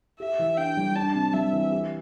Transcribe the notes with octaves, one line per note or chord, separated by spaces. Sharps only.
G4 E5
E3
D4 G5
G3
D4 A5
C3
G3 E5
E3
G4